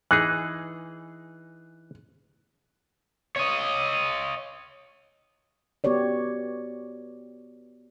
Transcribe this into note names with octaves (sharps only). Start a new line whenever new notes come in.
E3 D#4 G#4 F#6
C#5 D#5
B3 F#4 G4 C#5 D5